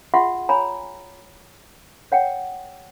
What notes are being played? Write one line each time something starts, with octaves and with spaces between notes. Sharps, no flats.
F4 G#4 E5 F#5 C6 C#6
C#5 G#5 A#5 B5
C#5 F#5 G5